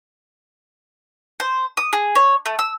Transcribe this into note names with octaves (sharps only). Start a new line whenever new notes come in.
C5
D#6
G#4
C#5
A3
E6